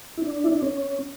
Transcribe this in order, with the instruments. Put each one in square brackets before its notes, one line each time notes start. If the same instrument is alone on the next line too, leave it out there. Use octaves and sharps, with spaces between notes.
[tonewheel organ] E4
D4
E4
D4
C#4